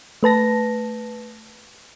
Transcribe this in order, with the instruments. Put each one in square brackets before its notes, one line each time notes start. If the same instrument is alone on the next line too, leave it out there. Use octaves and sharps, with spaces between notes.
[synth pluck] A3 B4 A5 A#6